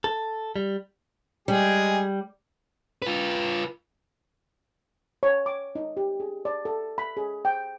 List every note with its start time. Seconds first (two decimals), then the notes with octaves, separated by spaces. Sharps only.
0.04 A4
0.56 G3
1.48 G3 G#3 G4 G#4
3.02 F4 B4
5.23 C#5
5.46 D6
5.75 D#4
5.97 G4
6.20 G#4
6.45 D5
6.65 A4
6.98 B5
7.17 G#4
7.45 G5